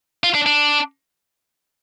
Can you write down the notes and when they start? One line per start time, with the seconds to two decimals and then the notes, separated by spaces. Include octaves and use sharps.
0.24 F4
0.35 D4
0.46 D4